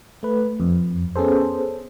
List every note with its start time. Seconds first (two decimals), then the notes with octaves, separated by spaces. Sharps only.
0.23 A3 B4
0.60 F2
1.16 B3 C#4 G#4 A4 C5